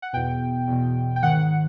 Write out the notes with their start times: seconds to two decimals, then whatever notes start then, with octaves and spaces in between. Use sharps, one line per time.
0.02 F#5
0.13 E2 B2 G5
0.68 E2 B2
1.16 G5
1.23 G#2 D#3 F#5